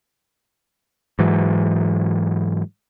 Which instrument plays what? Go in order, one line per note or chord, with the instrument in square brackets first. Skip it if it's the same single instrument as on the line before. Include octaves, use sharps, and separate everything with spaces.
[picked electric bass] G#2 E3 F#3